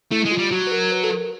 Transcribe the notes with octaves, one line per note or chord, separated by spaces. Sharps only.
A3 E4
G#3
F4
G3
F#3 F#4
B4
A#4
B4
A4
A#4